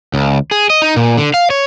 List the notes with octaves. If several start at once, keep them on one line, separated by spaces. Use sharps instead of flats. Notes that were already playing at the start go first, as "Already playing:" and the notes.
C#2
G#4
D#5
D#4
A#2
D3
F5
C#5